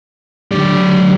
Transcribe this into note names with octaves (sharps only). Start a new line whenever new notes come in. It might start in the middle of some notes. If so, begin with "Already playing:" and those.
D3 F#3 D4 G4 D5